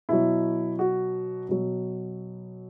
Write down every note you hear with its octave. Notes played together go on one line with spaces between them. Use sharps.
B2 F#3 E4
F#4
B2 F#3